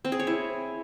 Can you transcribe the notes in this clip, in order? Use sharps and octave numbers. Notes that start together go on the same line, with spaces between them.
C4
G#4
C#5
E4